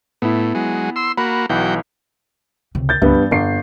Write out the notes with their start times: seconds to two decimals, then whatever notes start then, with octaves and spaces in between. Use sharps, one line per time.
0.22 A2 B3 E4
0.55 F#3 G#3
0.96 C6 E6
1.18 A#3 F#4 B5
1.50 B1 E3 F#3 G5
2.75 C#2 C3
2.89 G6 A6
3.02 C#2 G2 B3
3.15 E3
3.31 G1 F2 C7